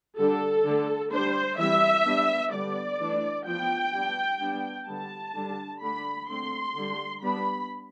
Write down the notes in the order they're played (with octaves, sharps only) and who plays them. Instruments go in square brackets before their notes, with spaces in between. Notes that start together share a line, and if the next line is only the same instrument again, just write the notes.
[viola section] D3 G3 D4 A4
D3 A3 D4
G3 D4 C5
E3 G3 C4 E5
G3 B3 D4
D3 G3 B3 D5
E3 A3 D4
F3 B3 D4 G5
G3 B3 D4
G3 B3 D4
D3 G3 B3 A5
D3 G3 D4
D3 A3 D4 B5
D3 A3 C4 C6
D3 G3 D4
G3 B3 D4 B5